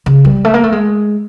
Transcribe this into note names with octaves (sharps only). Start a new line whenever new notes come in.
C#3
G3
A3
A#3
A3
G#3